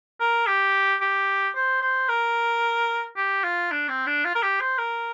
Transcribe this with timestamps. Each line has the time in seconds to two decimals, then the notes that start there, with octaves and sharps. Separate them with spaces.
0.20 A#4
0.47 G4
1.01 G4
1.55 C5
1.82 C5
2.09 A#4
3.17 G4
3.44 F4
3.71 D4
3.89 C4
4.07 D4
4.25 F4
4.35 A#4
4.43 G4
4.61 C5
4.78 A#4